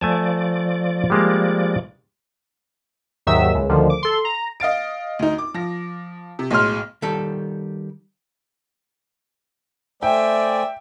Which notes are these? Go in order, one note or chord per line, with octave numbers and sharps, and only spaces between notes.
F3 A3 D5 G#5 A5
G3 G#3 A#3
D#2 G#2 D#3 F#3 E5 E6
C#2
D2 D3 D#3 F3
D6
A4 C6
A#5
D#5 F5 A6 D7
D2 D#4
D6
F3 A#6
C3
B1 A2 G#3 C6 F6
D#3 G3 A4
A3 C5 D5 E5 G5 G#5